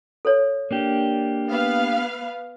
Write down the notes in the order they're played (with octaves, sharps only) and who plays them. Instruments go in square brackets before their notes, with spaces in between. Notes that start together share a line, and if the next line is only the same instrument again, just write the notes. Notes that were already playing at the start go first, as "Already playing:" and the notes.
[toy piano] A4 C5 C#5
[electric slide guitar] A#3 D4 G4
[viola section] B3 B4 F5